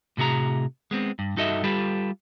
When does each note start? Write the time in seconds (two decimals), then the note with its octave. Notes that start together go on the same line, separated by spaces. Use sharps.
0.17 A2 C3 F#4 G#4 A#5
0.91 G#3 B3 C4
1.19 G2
1.37 G2 D#4 F#4 A4 D#5 E5
1.64 G3 F4 G4 A4 B4